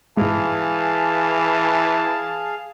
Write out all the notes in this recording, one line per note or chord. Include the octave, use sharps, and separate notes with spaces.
G#2 B2 E3 G#3 G#4 F5 A5